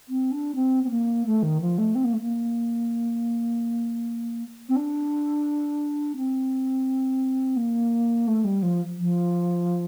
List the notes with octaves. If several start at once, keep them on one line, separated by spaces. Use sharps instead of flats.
C4
D4
C4
C4
A#3
A3
D#3
F3
A3
C4
A#3
A3
A#3
C4
D4
C4
A#3
A3
G3
F3
F3